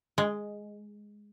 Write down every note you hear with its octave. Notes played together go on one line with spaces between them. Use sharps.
G#3